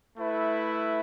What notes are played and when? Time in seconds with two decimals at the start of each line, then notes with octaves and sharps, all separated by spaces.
0.17 A3 E4 B4 E5